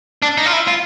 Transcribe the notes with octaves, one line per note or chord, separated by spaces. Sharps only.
D4
D#4
F4
E4
F4